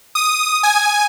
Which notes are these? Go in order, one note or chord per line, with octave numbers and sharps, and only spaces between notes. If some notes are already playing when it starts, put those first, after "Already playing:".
D#6
G#5